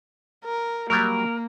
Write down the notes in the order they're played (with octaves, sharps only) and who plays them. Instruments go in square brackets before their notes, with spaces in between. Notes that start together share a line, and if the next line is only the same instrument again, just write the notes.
[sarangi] A#4
[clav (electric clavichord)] F#3 G3 [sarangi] A#3 [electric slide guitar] A#4